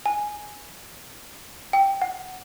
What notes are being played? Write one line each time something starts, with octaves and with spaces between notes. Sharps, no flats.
G#5
G5
F#5